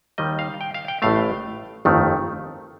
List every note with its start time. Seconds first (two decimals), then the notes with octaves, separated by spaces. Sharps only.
0.18 D#2 D#3 G3 D#5
0.39 F5
0.61 G5
0.74 F5
0.88 G5
1.02 A1 A2 A3 F5
1.85 G1 F2 D#3 A3